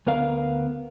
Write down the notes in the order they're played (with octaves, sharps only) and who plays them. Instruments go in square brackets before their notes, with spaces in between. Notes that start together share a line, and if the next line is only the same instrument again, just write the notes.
[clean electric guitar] D2 B3 A#4 F5